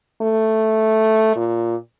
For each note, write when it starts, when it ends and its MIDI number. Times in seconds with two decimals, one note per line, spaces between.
0.22 1.36 57
1.36 1.76 46